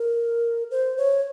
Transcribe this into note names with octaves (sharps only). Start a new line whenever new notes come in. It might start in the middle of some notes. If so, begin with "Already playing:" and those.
Already playing: A#4
C5
C#5